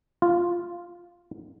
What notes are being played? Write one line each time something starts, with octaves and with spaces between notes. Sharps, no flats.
F4